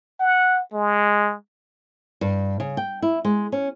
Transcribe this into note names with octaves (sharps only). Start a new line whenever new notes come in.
F#5
G#3
G2
C#3
G5
E4
G#3
C#4